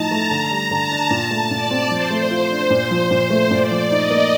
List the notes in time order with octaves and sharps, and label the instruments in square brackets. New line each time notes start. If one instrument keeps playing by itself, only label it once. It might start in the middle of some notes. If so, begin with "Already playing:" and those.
Already playing: [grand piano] A2 F3 D#4 [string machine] A5 A#5
[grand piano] A3
D3
G3
[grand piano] D3 [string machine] A5
[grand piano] D4
A#2
A3
[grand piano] A#2 [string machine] D5
[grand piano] C4
[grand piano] F3 [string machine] C5
[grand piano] A3
F4
D4
A#2
F3
[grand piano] A#2 [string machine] C5
[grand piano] A3
[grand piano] A#2 [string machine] D5
[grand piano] F3
[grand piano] D#4 [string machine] D#5
[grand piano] A#3